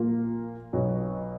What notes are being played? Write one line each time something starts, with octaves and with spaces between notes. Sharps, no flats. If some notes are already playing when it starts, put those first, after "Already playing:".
Already playing: A#2 F3 A#3 F4
B1 B2 F#3